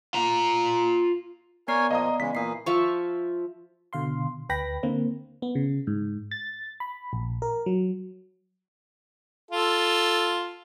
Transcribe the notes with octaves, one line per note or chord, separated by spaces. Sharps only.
F4 A#5
B3 A#4 C#5 D5 G#5 C7
A#2 F3 A#3 D#5 A#5 D#6
C#3 E3 G#3 B6
A#2 E3 A#3 D#6 C7
F3 E5 F5 C#6
B2 D3 F5 C6
D2 B4 G5 B5 A#6
D3 A#3 C4
B3
C#3
G#2
A6
B5
A#1
A#4
F#3
F4 A4